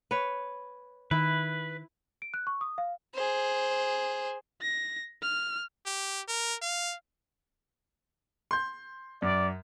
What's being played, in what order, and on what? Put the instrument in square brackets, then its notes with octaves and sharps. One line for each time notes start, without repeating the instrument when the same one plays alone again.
[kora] B4 C#5
[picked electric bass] D#3 [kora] E4 [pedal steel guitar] B4
[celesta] D7
F#6
C#6
D#6
F5
[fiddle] G#4 C5
[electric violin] A#6
F6
[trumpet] G4
A#4
F5
[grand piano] C6 G6
[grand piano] F#2 [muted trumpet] D5